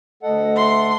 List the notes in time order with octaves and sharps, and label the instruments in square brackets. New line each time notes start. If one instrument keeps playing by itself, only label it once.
[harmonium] D2 A4 F#5 [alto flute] D#5
[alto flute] E5 [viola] C6